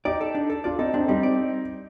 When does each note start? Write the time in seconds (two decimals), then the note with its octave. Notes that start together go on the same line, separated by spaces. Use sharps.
0.05 D#4 G4 D5
0.21 A4
0.35 D4
0.50 A4
0.64 D4 F4 D5
0.79 C4 D#4 A4
0.94 C4 D4 D#4
1.08 G3 C4 D#4
1.23 D5